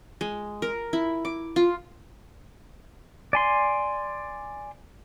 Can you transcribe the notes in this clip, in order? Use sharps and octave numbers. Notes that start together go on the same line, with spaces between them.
G#3
A#4
E4
D6
F4
D5 G#5 C6